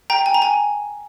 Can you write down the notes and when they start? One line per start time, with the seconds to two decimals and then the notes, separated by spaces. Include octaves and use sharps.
0.10 G5 A#5
0.26 G#5
0.34 A#5
0.42 G#5